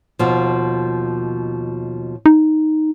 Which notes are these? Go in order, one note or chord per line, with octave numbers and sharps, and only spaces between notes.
D#2 B2 F3
D#4